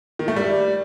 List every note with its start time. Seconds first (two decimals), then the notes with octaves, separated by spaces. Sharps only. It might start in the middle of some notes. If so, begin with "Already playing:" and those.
0.19 D#3
0.28 A3
0.36 G3